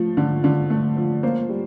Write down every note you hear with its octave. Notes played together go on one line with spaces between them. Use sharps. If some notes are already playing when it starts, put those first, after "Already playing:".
Already playing: F3 A3
D3
D3
A3
F3
A#3 C5
G3